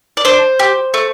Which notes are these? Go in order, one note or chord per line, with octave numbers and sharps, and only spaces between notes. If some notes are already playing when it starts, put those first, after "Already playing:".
D5
D4 C5
G4
A3